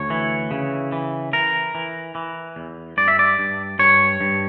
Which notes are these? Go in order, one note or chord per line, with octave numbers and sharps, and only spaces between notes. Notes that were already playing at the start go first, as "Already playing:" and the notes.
Already playing: D2 C#5
E3
C#3
E3
E3 A#4
E3
E3
E2
G2 D5
E5
D5
G2
G2 C#5
G2